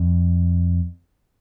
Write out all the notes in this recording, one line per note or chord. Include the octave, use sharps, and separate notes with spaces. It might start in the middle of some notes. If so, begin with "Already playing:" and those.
Already playing: F2